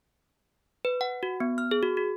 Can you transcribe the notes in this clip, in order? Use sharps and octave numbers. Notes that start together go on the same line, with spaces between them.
B4
F#5
F#4
B3
F6
G#4
F#4
F#4